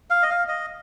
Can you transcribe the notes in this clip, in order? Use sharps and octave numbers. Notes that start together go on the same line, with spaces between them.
F5
D#5
F5
D#5